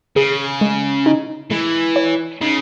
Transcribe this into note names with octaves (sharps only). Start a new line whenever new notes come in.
C#3 G#4
G#3
D#4
E3 G#3
C#5
C#3 D#4